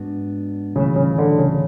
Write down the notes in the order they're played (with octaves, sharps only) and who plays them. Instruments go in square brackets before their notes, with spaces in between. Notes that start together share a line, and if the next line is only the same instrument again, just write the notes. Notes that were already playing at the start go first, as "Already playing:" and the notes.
Already playing: [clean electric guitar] G#2 G#3 B3 D4 F#4
[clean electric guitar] B1 A2 E3 [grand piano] C#3
[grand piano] C#3
D3
C#3